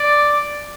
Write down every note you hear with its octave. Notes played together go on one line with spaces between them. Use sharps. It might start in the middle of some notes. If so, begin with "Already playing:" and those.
Already playing: D5